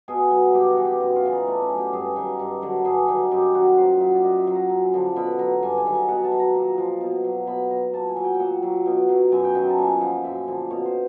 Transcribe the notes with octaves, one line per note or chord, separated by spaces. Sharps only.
B2 G#4
F#3
G2 G4
F#4
E3
G4
F#2 F#4
F4
C#3 E3
D#4
A2 D4
C#4
F#3
G4
G2 G#4
D#3 F#3
G2
D3 F#3
G2 G#4
D#3 F#3
F#2 G4
D#3 F#3 F#4
A#2 C5
F#3 E5
D5
A#2 D#5
E5
F#3
A#5
F#2
D3 F3
B2 B5
F#3 A#5
G2 G#5
G#5
D#3 F#3
G#5
B2 F#5
A5
F#3
A#5
A#2
F3
B2
F#3
B2 B5
F#3 A#5
A#2 A5
G#5
F#3
G5
G5
A#2 F#5
F#3
B2
F#3
F#2 G#5
G5
D#3 F#3 G#5
A5
A#2 G#5
F3 F#5
F#2 E5
D3 F3
B2 C#5
C5